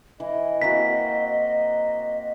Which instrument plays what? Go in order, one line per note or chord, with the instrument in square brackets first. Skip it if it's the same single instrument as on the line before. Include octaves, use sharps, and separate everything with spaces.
[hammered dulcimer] E3 [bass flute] D#5
[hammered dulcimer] A#3 C4 F#4 [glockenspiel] B6